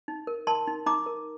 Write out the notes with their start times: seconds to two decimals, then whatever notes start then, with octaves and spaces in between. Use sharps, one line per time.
0.08 D#4
0.27 A#4
0.47 A#4 A5 C6
0.68 D#4
0.86 D#4 A#5 D6
1.06 A#4